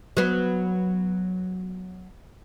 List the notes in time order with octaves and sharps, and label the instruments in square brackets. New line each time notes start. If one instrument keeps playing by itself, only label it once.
[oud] F#3 B3